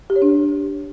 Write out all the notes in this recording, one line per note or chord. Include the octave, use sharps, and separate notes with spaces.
G4
C#5
D4